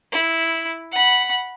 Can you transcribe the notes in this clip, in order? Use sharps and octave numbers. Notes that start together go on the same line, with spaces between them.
E4
F#5 B5